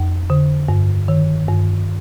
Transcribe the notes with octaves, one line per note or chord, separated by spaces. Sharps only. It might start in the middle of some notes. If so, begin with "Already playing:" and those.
Already playing: F2
D3
G2
D#3
G2